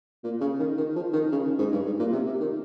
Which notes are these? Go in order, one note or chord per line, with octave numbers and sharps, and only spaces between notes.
A#2
C#3
D#3
D#3
F3
D#3
C#3
G#2
G2
G#2
A#2
C3
C3
D#3